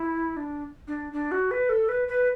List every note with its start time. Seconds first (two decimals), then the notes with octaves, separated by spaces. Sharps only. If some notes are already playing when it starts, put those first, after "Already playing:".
Already playing: E4
0.37 D4
0.88 D4
1.13 D4
1.31 F#4
1.51 B4
1.69 A4
1.89 B4
2.08 B4